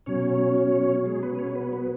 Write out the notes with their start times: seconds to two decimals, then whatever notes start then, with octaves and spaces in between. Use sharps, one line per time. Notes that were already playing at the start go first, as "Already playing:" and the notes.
0.06 B2 F#3 C#4 C#5
1.06 G#3 G#4
1.23 B3 B4
1.35 B4
1.39 C#4 C#5
1.55 B3 B4
1.73 B3 B4